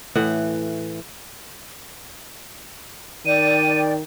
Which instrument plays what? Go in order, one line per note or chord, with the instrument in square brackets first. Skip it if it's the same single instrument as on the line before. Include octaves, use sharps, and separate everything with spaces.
[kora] A2 E3 F#5
[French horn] D#3 [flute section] D5 G5 [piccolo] D#7